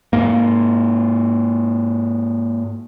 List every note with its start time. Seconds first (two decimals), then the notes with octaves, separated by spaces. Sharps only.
0.13 G#2 A#3